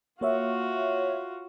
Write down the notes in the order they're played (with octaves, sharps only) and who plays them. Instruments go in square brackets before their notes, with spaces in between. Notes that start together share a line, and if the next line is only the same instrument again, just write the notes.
[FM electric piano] A#3 C#5 E5 [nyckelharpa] F4 F#4